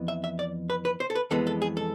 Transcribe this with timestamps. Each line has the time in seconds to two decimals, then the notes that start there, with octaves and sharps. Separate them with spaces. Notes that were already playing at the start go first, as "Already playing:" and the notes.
Already playing: F2 E3 B3
0.08 E5
0.24 E5
0.39 D5
0.70 B4
0.85 B4
1.00 C5
1.10 A4
1.15 B4
1.31 F2 E3 G#3 B3 A4
1.47 A4
1.62 G#4
1.77 A4